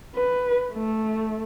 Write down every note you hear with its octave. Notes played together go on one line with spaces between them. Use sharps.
B4
A3